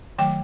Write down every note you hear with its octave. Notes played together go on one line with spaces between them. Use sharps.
D#3 F#3 A3 G5